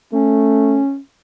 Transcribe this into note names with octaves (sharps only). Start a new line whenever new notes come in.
A3 C#4